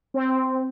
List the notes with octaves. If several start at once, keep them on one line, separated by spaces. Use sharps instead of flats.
C4